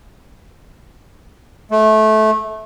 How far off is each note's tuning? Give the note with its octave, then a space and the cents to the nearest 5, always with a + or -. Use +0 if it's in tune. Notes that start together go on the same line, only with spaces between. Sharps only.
A3 -20